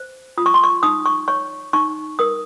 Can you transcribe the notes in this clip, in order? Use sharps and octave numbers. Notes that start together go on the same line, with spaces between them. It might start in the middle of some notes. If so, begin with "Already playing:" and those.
Already playing: C5
F4 D#6
C#6
C6
C#6
D#4 D#6
C#6
C#5 C#6
D#4 C#6
A#4 D#6